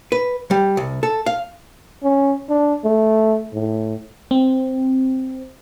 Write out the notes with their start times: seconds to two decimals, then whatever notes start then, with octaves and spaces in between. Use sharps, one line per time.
0.12 B4
0.51 G3
0.77 C2
1.03 A4
1.26 F5
2.03 C#4
2.49 D4
2.84 A3
3.54 A2
4.31 C4